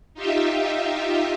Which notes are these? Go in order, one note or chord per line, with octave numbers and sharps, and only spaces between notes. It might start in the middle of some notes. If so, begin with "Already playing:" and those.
D#4 F4 G4 E5